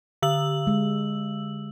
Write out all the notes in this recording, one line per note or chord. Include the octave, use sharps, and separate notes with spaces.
D3 E6 F#7
G#3